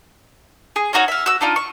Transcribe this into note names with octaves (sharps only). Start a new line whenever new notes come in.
G#4
C#4 D#4 F#4 C#5
E5 F5
F#4 E6
D4 D#4 F4
C#6